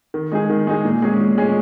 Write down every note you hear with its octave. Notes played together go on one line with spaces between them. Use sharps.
D#3
G#3 D#4 G#4
D#3
G#3 D#4 G#4
A#2
G#3 C#4 G#4
A#2
G#3 C#4 G#4